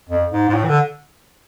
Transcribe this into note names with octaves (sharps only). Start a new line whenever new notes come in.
F2
G#2
G#2
A2
E3
D3